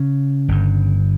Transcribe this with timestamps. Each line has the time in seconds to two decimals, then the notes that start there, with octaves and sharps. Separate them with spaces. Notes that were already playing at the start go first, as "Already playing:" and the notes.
Already playing: C#3 C#4
0.48 G1 G2